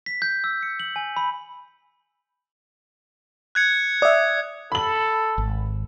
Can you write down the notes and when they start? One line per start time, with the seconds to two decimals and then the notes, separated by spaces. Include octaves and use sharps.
0.06 B6
0.22 G6
0.44 E6
0.63 C#7
0.80 F#7
0.96 G#5
1.16 B5
3.55 F#6 G#6 C#7
4.02 D5 E5 D#6
4.72 A4 B5 F#7
5.38 G#1